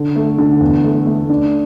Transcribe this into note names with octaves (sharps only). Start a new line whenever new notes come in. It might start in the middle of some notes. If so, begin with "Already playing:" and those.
Already playing: D3
A3
D3
E2
A3
A3
D4